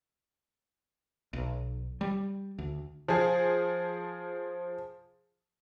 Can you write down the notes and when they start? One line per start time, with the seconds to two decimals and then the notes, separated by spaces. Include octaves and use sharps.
1.33 B1
2.01 G3
2.58 D2
3.08 F3 G#4